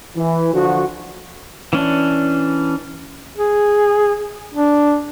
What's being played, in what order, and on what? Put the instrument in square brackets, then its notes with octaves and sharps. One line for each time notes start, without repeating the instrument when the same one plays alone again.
[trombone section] E3
D3 F3 F#4
[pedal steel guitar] E3 C#4 D4
[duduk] G#4
D4